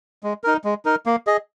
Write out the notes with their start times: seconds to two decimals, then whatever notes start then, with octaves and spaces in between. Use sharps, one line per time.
0.23 G#3
0.44 D#4 A#4
0.64 G#3
0.85 D#4 A#4
1.06 A#3
1.27 G#4 D#5